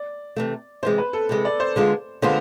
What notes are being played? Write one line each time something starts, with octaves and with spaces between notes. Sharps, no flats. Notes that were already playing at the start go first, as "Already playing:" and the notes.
Already playing: D5
C3 E3 A3
C3 E3 G#3 C5
B4
A4
C3 E3 G#3
D5
C5
D3 G#3 B3 F4
D3 G#3 B3 F4 C5